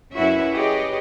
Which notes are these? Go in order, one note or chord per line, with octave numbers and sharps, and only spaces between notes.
F#2 C#4 E4 F#4 B4 E5
G4 G#4 B4 C#5 D#5